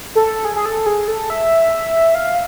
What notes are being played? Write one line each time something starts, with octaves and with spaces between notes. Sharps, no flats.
A4
G#4
G#4
A4
G#4
A4
E5
F5